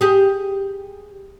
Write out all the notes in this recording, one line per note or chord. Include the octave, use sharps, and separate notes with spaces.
G4 G#4